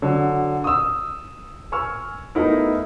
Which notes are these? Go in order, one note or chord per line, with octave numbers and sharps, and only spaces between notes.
D3 F#3
D#6 E6
G#5 C#6 E6 F6
A3 B3 D#4 E4 A#4